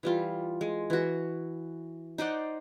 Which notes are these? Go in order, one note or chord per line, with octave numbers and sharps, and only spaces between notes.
E3 G3 F4
G#3
E3 F#4
D#4 C5 D5 F#5